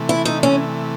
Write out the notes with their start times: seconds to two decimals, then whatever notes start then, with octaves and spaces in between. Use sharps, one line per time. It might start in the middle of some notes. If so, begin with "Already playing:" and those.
Already playing: C3 E3 A3
0.09 E4
0.25 D#4
0.43 C#4